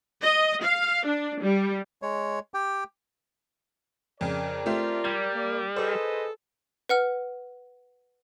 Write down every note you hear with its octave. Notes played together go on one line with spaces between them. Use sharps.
D#5
F5
D4
G3
G#3 C#5
G4 G5
F2 C#3 A#4 D5
A3 C4 F4 G4
G3 G#6
A#3
G#4 A4 B4 C5 D#5
B4 F#5 F6